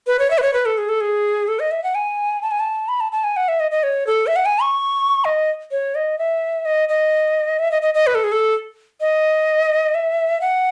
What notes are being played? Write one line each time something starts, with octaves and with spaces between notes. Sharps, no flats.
B4
C#5
E5
B4
C#5
B4
A4
G#4
A4
G#4
A4
D#5
E5
F#5
G#5
A5
G#5
A5
B5
A5
A5
G#5
F#5
E5
D#5
D#5
C#5
A4
E5
F#5
G#5
C#6
D#5
C#5
D#5
E5
D#5
D#5
E5
D#5
D#5
D#5
B4
A4
G#4
A4
D#5
E5
F#5